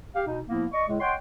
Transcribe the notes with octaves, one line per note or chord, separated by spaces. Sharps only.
G4 F5
B2 D#4
A2 F3 A#3 B3 E4
D5 D#5 C#6
A2 C#3 G#3
C#5 D#5 F#5 G5 C6